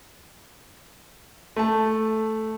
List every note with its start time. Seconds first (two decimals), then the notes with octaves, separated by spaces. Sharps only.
1.56 A3 A5